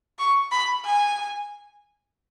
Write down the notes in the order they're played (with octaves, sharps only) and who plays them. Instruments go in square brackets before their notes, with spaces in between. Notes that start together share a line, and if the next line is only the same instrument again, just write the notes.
[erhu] C#6
B5
G#5